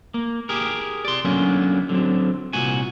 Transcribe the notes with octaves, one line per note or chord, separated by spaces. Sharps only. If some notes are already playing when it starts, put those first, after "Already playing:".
A#3
G4 G#4 A#4
D5 C6
D3 F#3 A#3 B3 C#4
D3 F#3 C4
C2 A#2 F#4 G#5